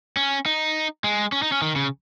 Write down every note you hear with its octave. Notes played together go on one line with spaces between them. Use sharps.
C#4
D#4
G#3
C#4
D#4
C#4
D#3
C#3